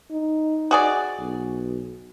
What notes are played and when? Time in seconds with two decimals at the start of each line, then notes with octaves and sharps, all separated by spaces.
0.11 D#4
0.71 F#4 G#4 D5
1.20 B1